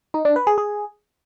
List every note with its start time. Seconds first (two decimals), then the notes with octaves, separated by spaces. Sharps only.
0.14 D#4
0.25 D4
0.36 B4
0.47 G#4
0.58 G#4